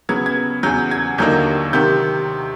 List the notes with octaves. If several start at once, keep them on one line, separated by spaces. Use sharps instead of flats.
C#3 F#3 B3 G#6
G#6
E2 C#3 F#3 G6
G#6
D#2 D3 F#3 A#3 D#4 G6
C3 D#3 G6